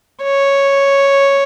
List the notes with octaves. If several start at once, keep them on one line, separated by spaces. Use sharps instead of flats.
C#5